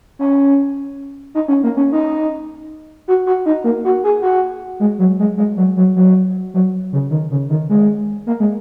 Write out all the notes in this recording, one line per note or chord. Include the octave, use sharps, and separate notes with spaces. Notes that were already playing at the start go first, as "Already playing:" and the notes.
C#4
D#4
C#4
A#3
C#4
D#4
F#4
F#4
D#4
A#3
F#4
G#4
F#4
G#3
F#3
G#3
G#3
F#3
F#3
F#3
F#3
C#3
D#3
C#3
D#3
G#3
A#3
G#3